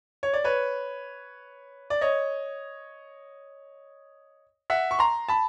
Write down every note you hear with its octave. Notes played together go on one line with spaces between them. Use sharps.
C#5
D5
B4 C#5
D5
C#5 D#5
E5 F#5
C#6
A#5 C6
A5 B5